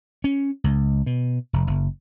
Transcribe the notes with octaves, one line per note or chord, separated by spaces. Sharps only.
C#4
C#2
B2
F1
F#1